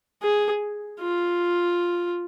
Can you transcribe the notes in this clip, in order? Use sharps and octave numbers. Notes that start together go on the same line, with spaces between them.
G#4
F4